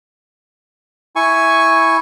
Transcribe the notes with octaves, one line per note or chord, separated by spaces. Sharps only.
E4 G#5 C#6